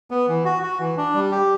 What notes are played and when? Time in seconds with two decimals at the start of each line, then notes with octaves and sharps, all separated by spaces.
0.11 B3
0.28 E3
0.45 F#4
0.63 F#4
0.79 E3
0.97 D4
1.14 G3
1.31 G4